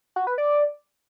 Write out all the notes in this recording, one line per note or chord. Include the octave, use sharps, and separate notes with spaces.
F#4
B4
D5